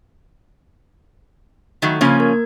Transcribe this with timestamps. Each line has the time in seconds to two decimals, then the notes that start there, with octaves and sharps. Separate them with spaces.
1.82 D#3 F#3 A3
2.01 C#3 F3 A#3 C#4 G#6
2.20 A#4